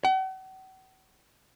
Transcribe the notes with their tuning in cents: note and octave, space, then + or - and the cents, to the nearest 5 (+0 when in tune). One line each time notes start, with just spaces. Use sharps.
F#5 +40